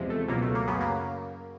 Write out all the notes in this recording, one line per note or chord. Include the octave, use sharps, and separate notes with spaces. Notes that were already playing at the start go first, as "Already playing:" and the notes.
Already playing: E2 C3 F3 G#3
A3
C#2 B2 F#3 A#3
A3
A#3
F#2 C#3 F#3 B3
A#3